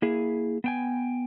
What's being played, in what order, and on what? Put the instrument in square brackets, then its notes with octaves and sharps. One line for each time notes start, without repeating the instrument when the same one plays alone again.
[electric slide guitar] A#3 E4 G#4
B3 G5 G#5